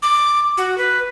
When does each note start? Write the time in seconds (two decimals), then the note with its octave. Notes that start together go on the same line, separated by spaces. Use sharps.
0.03 D6
0.57 F#4
0.78 B4